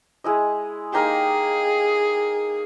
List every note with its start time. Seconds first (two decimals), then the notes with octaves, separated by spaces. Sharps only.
0.24 G#3 E4 D#5
0.93 A#3 D#4 G4 G#4